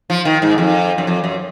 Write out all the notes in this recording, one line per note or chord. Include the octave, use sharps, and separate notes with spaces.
F3
D#3
G#2
F2
F#2
F2
F#2